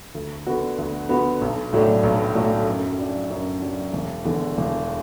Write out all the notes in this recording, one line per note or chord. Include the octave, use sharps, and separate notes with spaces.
D2
D3 B3 F#4
D2
D3 B3 F#4
B1
A2 F#3 A3 D4
B1
A2 F#3 A3 D4
F#2
F#3 D4
F#2
F#3 D4
E1
E2 D3
E1